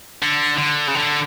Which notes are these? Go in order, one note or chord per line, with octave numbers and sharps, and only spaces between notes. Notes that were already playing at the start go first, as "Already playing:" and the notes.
D3
D3
C#3
D3